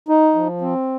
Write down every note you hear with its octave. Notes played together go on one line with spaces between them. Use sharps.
D#4
F3
C4